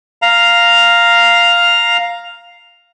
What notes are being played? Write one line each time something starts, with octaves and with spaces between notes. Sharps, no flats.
F5 A#5